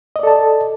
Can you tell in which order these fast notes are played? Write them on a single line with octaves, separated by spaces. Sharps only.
D#5 D5 A4 A5